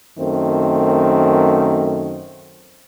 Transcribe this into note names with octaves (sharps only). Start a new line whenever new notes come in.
F#2 D#3 A3 C4